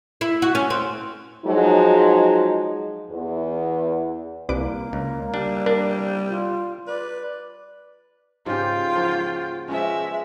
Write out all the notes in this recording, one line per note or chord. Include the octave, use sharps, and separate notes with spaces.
E4
F#4
C#4
C4
F3 F#3 G#3 D#4
E2
C2 A#3 B4 D6
C#2
G3 D4
D4 A#4
F4
B4 D5
G#2 C#3 F4 G4 G5
F3 A#3 F#4
F3 G#3 B3 C#4 E5